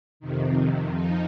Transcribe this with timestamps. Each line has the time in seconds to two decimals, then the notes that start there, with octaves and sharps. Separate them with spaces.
0.20 F2 C3 D#3
0.92 F2 F3 D#4